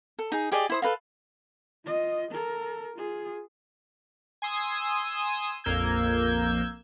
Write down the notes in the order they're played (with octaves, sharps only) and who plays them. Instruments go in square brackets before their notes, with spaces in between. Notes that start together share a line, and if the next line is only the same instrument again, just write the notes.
[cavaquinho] A4
D#4 G#4
G4 G#4 D5 D#5
E4 C5 D#6
A4 B4 D#5 F5
[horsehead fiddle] F4 D#5
A4 A#4
F4 G#4
[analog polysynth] G#5 C6 D#6 E6
A#1 F2 A#3 E6 G6 G#6